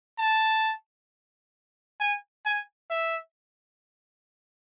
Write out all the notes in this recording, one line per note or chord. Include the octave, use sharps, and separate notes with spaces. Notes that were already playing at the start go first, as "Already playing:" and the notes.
A5
G#5
G#5
E5